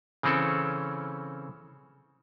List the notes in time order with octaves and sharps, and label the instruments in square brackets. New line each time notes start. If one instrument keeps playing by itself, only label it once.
[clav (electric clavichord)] C#3 E3 C4 C#4 A4